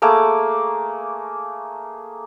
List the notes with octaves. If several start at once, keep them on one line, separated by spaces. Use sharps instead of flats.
A3 A#3 G#4 D6